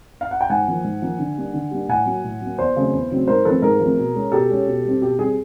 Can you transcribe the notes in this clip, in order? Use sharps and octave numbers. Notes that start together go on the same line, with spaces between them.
F5
F#5
G5
G#2 F#5 G#5
F3 A#3
G#2
F3 A#3
D3
G3 A#3 D4
D3
G3 A#3 D4
A2 F#5 G#5
F#3 A#3
A2
F#3 A#3
E2 C5 D5
C#3 F#3 A3 C4
E2
C#3 F#3 A3 C4
G#2 A#4 C5
F3 A3 C4 A4 B4
G#2 G#4 A#4
F3 A3 C4
B2
G#3 C#4
B2 G4 A4
G#3 C#4
B2
G3 C4
B2 G4
G3 C4 G#4